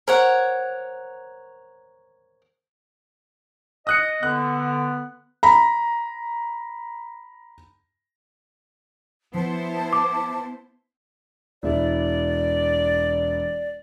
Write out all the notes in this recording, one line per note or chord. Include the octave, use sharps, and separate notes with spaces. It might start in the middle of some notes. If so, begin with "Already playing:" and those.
A#4 C5 C#5 F#5
D#5 D#6 F#6 C#7
D3 B3 F#6
A#5 B5
F3 B3 E4 C5 A5
D6
E1 E4 D5